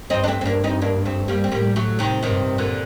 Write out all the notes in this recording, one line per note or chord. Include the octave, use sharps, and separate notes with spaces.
G2 C4 D#4
D4
A3 C4
C4
G2 A#3 D4
C4 D#4
A#3 D4
A3 C4
G3 A#3
C4
A2 G3 A#3
F#3 A3
C3 D#3
G2 C3 D#3
A#2 D3